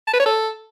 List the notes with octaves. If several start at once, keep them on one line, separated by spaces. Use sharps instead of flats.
A5
B4
C#5
A4